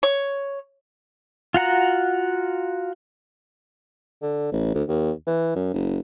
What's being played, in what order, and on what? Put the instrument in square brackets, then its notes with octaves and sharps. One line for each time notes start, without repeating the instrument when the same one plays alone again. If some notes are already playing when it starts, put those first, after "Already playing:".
[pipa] C#5
[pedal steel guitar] F4 F#4 F#5 A#5
[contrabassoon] D3
A1
D2
D#2
E3
F#2
F#1